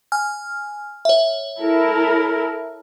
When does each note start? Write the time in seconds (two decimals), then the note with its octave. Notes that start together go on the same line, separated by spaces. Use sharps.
0.12 G#5 F6
1.05 C#5 E5
1.59 E4 A4 A#4